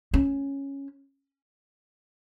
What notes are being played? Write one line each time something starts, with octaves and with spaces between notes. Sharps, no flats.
C#4